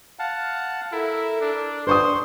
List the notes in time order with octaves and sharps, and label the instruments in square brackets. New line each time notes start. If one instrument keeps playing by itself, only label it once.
[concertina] F5 F#5 A5
[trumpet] E4 [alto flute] A4 [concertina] A#4
[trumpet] D4
[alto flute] D4 [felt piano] B4 C#6 D#6 [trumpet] C5 [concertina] C6